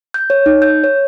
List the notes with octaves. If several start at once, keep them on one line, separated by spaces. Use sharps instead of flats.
G6
C#5
D#4
G6
C#5